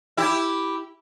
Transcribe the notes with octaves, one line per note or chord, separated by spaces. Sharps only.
E4 G4